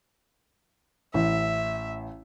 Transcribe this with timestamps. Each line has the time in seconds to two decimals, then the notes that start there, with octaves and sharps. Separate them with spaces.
1.14 A1 E5